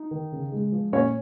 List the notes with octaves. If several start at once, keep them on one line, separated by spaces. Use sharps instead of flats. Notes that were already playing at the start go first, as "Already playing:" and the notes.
Already playing: D#4
D#3
C#3
G#3
F3
A#2 C#4 C#5